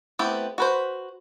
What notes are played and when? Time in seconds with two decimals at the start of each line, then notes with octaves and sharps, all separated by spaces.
0.19 A3 B3 C4 E4 G4
0.58 F#4 B4 C5